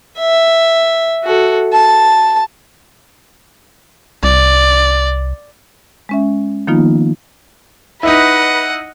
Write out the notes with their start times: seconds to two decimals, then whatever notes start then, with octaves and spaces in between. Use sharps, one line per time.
0.19 E5
1.24 F#4 A4
1.73 A5
4.23 C2 D5
6.09 G#3 C#4 E5
6.67 D#3 F3 A#3 B3 D#4 F4
8.03 D#4 E4 B4 D#5 F#5